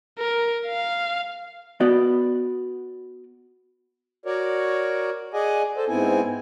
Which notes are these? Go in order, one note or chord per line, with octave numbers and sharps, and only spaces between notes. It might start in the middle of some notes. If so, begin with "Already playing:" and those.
A#4
F5
B3 F#4 D5 D#5
F#4 A#4 C#5 D5
G#4 D5 D#5 F#5 G#5
A4 C5
G#2 B3 C4 E4 G#5